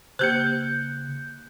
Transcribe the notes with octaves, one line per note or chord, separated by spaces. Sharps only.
C#3 A#3 G4 C5 F#6 G6 C#7